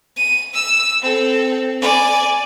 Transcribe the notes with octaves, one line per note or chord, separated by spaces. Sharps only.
D#7
E6
C4 A4
D5 G#5